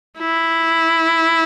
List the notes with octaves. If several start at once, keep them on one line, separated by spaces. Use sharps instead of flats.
E4